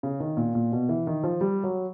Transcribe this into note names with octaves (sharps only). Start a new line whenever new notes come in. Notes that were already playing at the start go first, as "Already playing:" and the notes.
C#3
D#3
A#2
A#2
B2
E3
D#3
F3
G3
F#3